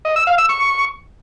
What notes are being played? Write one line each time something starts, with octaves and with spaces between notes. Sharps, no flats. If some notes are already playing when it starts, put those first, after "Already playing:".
D#5
E6
F5
E6
C#6